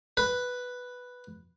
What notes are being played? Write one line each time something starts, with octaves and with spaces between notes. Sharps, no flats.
B4